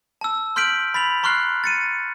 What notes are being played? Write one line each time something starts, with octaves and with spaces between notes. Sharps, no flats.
A5 E6
C6 F6 G6 B6 D7 F#7
B5 A6 B6 F7 F#7
A#5 C6 C#6 F6 F#6 C7
A6 C#7 D#7